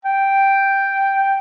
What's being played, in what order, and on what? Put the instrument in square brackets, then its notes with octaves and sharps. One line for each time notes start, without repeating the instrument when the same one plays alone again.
[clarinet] G5